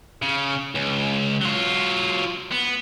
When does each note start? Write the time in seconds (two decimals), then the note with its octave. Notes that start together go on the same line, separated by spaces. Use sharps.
0.22 C#3
0.75 C#2
1.41 F#3 F4
2.52 B3